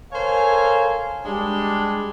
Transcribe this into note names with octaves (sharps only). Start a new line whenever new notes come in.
A4 A#4 C5 C#5 F5 G#5
G3 G#3 D4